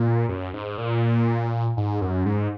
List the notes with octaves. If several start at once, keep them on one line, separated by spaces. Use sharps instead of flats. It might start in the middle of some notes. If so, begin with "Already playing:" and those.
Already playing: A#2
F#2
G#2
A#2
G#2
F#2
G#2